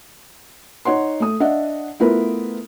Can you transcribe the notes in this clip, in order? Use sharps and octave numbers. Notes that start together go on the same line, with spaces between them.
D#4 C#5 F#5 C6
A3 D#6
D4 D#5 E5 F#5
A3 B3 E4 F4 A#4 B4